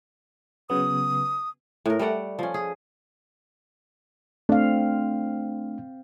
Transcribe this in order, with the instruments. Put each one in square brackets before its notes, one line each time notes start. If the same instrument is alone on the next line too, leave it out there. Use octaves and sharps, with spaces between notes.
[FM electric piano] C#3 F#3 B3 [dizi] D#6
[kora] A2 A#4
G3 A3 D5 F#5
F3 C#4
G#4
[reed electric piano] A3 D4 [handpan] C4 F5